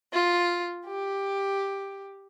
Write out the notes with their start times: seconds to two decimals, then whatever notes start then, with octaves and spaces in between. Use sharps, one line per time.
0.13 F4
0.87 G4